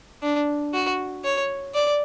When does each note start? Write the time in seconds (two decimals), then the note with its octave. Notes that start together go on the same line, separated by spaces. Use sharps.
0.23 D4
0.74 F#4
1.25 C#5
1.74 D5